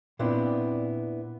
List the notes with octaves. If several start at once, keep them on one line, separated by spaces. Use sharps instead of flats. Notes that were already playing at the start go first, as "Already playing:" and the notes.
A#2 B3 C4 D4 E4